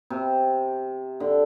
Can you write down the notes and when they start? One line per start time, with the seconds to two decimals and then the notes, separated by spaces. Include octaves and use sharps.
0.10 C3
1.20 D3